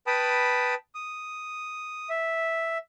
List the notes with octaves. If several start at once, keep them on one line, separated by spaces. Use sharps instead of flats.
B4 G5 A5 B5 D#6
D#6
E5